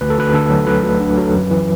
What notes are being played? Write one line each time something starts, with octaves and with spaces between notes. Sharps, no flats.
D2 B4
A4
D2 B4
D3 A4
F#3
D2 B4
D2
D3
F#3
F#2
E3